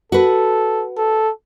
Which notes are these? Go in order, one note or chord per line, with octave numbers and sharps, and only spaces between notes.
F#4 A4 B4
A4